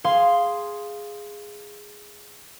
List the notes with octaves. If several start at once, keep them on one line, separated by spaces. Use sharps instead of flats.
G#4 F5 C6